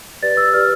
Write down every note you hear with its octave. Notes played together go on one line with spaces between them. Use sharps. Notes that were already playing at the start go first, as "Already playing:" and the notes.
G4 B4 D5 A6
E6
G4 B4 D5 F6